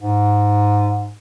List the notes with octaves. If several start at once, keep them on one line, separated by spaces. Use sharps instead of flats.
G#2